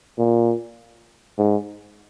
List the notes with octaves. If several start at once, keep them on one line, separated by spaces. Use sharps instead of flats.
A#2
G#2